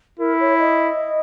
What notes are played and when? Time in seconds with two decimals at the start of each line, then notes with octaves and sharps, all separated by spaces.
0.19 E4 A#4
0.40 C#5
0.59 D#5